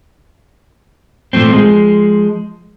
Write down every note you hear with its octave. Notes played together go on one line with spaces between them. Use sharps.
A#2 C#3 F3 A3 C4
F3 G#3